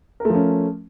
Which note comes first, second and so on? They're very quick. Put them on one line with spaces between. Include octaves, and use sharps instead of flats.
A#4 A3 F3 C#4